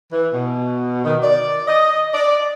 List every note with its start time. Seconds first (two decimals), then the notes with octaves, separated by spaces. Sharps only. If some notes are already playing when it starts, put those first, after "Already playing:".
0.12 E3
0.33 B2
1.05 D#3
1.23 D5
1.68 D#5
2.14 D5